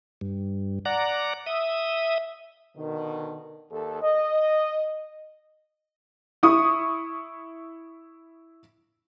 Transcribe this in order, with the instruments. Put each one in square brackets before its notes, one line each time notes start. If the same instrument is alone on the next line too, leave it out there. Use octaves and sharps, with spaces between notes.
[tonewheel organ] G2
D5 F#5 A#5
E5 D#6
[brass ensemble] B2 D3 D#3
D#2 A4
D#5
[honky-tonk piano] E4 C#6 D#6